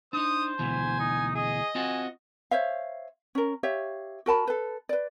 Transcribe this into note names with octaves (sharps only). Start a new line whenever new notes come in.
D4 D#4 C5 D#6
D2 B2 E3 G#5
D#4
G#4 D#5
C4 F4 F#4 G#5
C5 C#5 E5 F5
C#4 A#4
G4 C#5 E5 F5
F#4 A#4 A5 B5
A4 B4
B4 D5